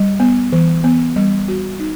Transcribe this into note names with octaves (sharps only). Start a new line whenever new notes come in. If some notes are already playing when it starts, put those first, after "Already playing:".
Already playing: G3
B3
E3
B3
G3
F#4
D#4